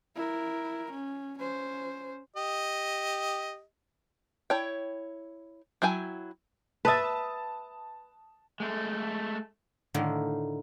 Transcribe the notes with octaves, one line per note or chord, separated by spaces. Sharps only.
E4 A#4
C#4
C#4 C5
G4 D#5
E4 C#5 G5
F#3 E4 G5 G#5
B4 E5 A5 D#6 A6
G#3 A3
A2 D3 D#3 A3 A#3